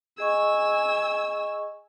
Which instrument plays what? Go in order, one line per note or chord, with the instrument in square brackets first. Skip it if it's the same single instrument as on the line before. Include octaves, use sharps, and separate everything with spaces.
[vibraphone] G#4 D#5 C#6 [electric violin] G#5 E6